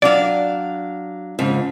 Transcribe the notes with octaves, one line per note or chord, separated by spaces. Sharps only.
F#3 D4 D5 F5
F2 G#2 C#3